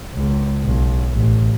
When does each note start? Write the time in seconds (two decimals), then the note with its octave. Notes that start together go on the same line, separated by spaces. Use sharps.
0.14 C#2
0.64 B1
1.15 A1